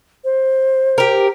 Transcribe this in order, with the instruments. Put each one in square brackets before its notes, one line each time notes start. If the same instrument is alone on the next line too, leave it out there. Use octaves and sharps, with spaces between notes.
[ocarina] C5
[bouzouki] G4 A#4